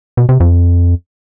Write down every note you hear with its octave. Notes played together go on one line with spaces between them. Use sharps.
B2
C3
F2